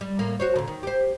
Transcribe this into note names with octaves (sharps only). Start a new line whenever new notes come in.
G3
A2 A#3
F#4 C5 C#5
A#2 D3
D#3
G4 C5